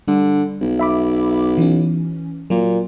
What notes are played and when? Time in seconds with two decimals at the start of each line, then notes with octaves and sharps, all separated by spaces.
0.08 D3 G3
0.61 B1
0.79 E5 B5 D6
1.58 E3 C#4
2.50 A#2 F#3